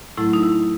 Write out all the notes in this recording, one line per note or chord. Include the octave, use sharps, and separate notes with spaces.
A2 F#3 A3 E4
D#4
E4